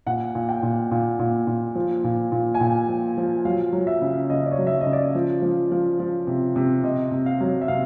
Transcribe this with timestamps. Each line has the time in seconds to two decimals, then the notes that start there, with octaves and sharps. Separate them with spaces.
0.06 A#2 F#5
0.35 A#2
0.49 G5
0.63 A#2
0.91 A#2
1.19 A#2
1.47 A#2
1.75 F3
2.04 A#2
2.32 A#2
2.55 G#5
2.60 A#2 G5
2.89 F3
3.17 F3
3.45 F#3 F5
3.73 F#3
3.87 E5
4.01 C#3
4.30 C#3 D#5
4.46 D5
4.52 C#5
4.59 F#3
4.67 E5
4.81 D#5
4.86 C#3
4.93 D5
5.15 F3
5.42 F3
5.71 F3
6.00 F3
6.27 C3
6.56 C3
6.84 C3 D#5
7.11 C3
7.26 F5
7.41 F#3
7.61 E5
7.68 C3 F5